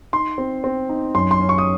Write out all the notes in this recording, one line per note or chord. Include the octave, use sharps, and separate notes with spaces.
D#4 C6
C4
C4
D#4
F#2 C6
C6
C#4
C#6
D#6